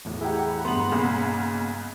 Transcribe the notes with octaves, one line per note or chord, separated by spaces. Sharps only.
E2 A2 E3
E4 G4 G#4 F#5 A#5 B5
G2 B3 C6 F#7
B1 C#3 A#3